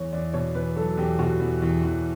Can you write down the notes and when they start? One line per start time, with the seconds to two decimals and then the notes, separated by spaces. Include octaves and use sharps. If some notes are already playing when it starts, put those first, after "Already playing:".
Already playing: E2 C#5
0.12 E2 D5
0.33 B2 C#5
0.55 E2 B4
0.76 F#3 A4
0.97 E2 G4
1.19 B2 F#4
1.40 E2
1.62 E2
1.83 E2